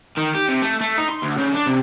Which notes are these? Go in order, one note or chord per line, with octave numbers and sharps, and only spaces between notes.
D#3
G4
C3
A3
A3
D#4
C6
D2
C#3
D4
C3